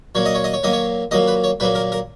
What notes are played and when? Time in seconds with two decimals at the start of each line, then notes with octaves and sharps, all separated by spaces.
0.15 A#2 F#3 A#3 C#5
0.25 D#5
0.35 C#5
0.44 D#5
0.54 C#5
0.63 A#2 F#3 A#3 D#5
0.73 C#5
1.11 A#2 F#3 A#3 D#5
1.27 B4
1.44 C#5
1.60 A#2 F#3 A#3 B4
1.75 A#4
1.92 A#4